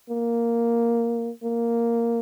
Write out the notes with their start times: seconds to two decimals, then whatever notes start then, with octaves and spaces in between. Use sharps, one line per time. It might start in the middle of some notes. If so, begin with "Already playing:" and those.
0.10 A#3
1.43 A#3